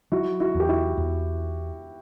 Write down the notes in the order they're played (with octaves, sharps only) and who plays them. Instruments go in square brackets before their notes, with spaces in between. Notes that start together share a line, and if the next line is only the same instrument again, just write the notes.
[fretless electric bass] F#3 [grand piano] E4 F#4
[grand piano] E4 F#4
[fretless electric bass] E2
[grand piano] G4
E4 F#4
[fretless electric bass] E2